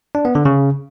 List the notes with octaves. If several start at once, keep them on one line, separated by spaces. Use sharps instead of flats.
D4
B3
D3
C#3